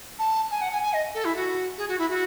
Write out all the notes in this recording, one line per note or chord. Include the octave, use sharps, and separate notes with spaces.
A5
G#5
F#5
G#5
G#5
D#5
A4
E4
F#4
G#4
F#4
E4
F#4